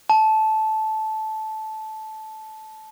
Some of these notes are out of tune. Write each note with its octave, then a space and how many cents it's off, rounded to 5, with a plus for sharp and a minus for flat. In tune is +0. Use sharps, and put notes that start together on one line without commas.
A5 -15